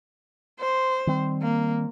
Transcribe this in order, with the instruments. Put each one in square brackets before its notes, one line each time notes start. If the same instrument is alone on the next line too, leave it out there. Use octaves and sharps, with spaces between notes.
[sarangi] C5
[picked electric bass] D#3 G3 C4
[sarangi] A#3